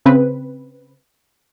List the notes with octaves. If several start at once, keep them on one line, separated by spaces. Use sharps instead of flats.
C#3 C4 B4